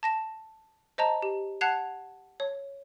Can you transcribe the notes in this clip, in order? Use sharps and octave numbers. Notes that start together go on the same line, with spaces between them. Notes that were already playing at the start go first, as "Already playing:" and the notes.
A5 A#6 E7
C5 D#5 A5 A#5
G4
F#5 A5 F#6 G#6 C7 F7
C#5